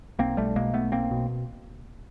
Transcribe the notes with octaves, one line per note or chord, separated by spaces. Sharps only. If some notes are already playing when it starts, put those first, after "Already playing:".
B1 A#3 C4
B1 G3 A3
B2 G#3 A#3
B1 A3 B3
B1 A#3 C4
B2